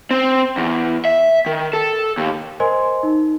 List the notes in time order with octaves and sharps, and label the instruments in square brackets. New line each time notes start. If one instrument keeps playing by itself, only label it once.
[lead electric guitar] C4
E2
E5
D#3
A4
D#2
[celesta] A#4 C5 D#5 G#5 C6
D#4